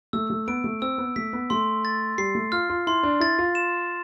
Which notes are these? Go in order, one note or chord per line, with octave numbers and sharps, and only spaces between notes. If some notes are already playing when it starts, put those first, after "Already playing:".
A3 E6
A3
B3 D7
A3
C4 E6
B3
A3 B6
B3
A3 C6
A6
G3 C7
A3
F4 F6
F4
E4 C6
D4
E4 A6
F4
E7